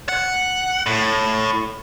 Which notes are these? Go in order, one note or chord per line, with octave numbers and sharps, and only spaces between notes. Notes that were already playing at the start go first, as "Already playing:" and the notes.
F#5
A2